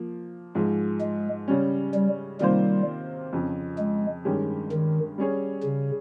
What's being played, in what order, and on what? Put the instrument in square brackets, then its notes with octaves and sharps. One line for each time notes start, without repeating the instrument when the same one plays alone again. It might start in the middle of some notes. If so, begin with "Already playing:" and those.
Already playing: [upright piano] F3 A#3
G#2 F3 G#3
[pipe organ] G#3
[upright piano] C#3 G3 C#4
[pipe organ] G3
[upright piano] C3 D#3 A#3 F4 C5 [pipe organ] G3
[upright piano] F2 C#3 F3
[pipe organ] G#3
[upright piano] G2 D#3 G#3 C#4 G4
[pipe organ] D#3
[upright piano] G3 C#4 G#4 C#5
[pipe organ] C#3